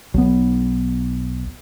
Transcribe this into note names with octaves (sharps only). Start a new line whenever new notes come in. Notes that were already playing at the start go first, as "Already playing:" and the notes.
B1 B3